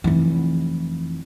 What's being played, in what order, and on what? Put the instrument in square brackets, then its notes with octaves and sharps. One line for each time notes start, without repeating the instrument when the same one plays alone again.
[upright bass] F1 E3